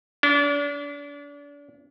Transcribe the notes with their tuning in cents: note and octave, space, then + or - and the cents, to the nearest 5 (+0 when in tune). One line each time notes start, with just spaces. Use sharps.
D4 -35